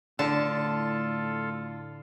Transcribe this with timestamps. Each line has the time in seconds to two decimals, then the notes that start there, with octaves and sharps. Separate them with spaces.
0.19 A2 D3 F4 A4 A5